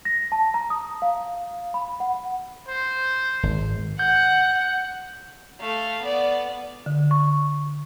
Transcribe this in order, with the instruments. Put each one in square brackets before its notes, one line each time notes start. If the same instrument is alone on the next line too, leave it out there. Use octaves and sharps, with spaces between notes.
[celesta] A#6
A5
A#5
D#6
F5
B5
F#5
[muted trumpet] C5
[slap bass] G#1
[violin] F#5 [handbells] G6
[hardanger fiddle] A3 F5
B3 D5
[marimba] D3
C#6